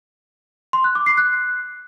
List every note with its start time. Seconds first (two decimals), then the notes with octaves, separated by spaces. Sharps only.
0.73 C6
0.84 F#6
0.95 D6
1.06 C7
1.17 F#6